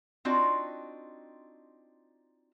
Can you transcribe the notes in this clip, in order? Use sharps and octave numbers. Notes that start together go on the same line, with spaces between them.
C4 D4 D#4 F4 F#4